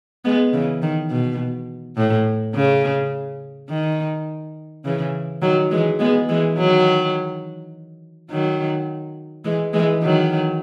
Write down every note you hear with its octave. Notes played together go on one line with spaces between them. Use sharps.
G#3 B3
C#3 E3
D#3
B2
A2
C#3
D#3
C#3 E3
D#3 F#3
E3 G#3
G#3 B3
E3 G#3
D#3 F#3
D#3 F#3
E3 G#3
E3 G#3
D#3 F#3